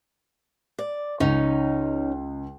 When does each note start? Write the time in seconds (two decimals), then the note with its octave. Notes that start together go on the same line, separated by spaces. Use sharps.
0.79 D5
1.20 C#2 C#4 D#4